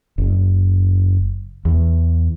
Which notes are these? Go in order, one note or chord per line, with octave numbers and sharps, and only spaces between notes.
F#1
E2